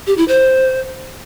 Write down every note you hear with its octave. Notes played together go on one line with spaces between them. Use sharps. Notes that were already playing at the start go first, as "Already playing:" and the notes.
G4
E4
C5